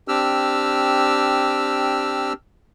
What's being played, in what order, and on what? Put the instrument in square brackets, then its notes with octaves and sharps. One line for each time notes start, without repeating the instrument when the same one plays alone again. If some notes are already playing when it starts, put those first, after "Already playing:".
[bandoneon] C4 D4 G4 E6 F6